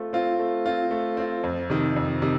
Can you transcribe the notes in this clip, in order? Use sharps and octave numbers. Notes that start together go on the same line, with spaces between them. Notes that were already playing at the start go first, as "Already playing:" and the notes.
Already playing: A3 C4 F4
C4 F4
A3
C4 F4
A3
C4 F4
F2
C3 D#3
F2
C3 D#3